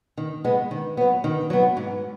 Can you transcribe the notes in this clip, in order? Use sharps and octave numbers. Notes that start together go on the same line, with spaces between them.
D#3
G#3 B3
D#3
F#3 B3
D#3
F#3 B3
G#2